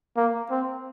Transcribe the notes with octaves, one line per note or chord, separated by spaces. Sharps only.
A#3
C4